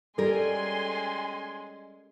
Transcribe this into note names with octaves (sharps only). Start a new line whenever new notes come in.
G3 G#3 C#4 A4 A#4 G#5 C6